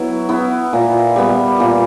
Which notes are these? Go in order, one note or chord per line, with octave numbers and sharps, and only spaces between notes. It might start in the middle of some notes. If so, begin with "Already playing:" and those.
Already playing: F#3 B3 E4
B3 E4
A#2
G3 B3
A#2